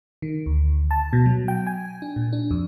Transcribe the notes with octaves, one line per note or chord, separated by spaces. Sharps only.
D#3
D2
A5
B2
F#3
G5
G#5
D4
A#2
D4
F2